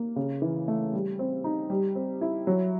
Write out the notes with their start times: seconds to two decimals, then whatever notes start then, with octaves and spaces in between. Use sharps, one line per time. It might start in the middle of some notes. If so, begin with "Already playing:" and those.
Already playing: A#3
0.16 C#3
0.42 E3
0.68 A3
0.93 G3
1.19 C4
1.44 D#4
1.70 G3
1.95 C4
2.21 E4
2.47 F#3